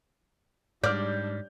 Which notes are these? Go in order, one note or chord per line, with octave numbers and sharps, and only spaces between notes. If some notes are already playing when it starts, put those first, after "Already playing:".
G#2 G3 D4 D5 F6 G6